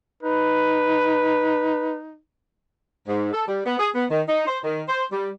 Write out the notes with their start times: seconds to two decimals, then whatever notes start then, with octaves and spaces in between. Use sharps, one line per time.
0.23 D#4 B4
3.08 G#2
3.33 A4
3.48 G3
3.66 B3
3.79 G#4
3.94 B3
4.10 D#3
4.28 D#4
4.47 C5
4.64 D#3
4.88 C5
5.13 G3